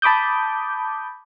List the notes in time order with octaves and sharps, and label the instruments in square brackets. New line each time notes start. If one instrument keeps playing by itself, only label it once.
[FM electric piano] A5 B5 D6 D#6 G6